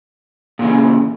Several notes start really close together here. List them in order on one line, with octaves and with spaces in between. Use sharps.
A#2 E3 C#3